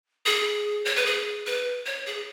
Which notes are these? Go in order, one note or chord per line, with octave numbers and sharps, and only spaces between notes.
G#4
C#5
B4
G#4
B4
C#5
G#4